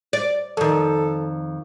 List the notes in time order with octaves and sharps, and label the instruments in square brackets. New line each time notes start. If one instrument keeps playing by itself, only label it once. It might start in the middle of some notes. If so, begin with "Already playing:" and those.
[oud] D5
[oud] F2 D#3 [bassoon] A4